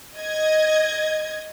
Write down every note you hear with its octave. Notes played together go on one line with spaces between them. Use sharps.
D#5 G#6